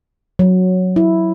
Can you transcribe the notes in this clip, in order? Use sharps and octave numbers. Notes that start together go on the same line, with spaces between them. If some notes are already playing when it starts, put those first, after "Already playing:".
F#3
E4